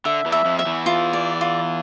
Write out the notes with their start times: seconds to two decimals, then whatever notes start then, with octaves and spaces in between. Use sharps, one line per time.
0.05 D3 E5
0.26 E2 E3
0.32 E5
0.45 F2 F3
0.59 E5
0.66 E2 E3
0.86 F4
1.13 D5
1.41 F4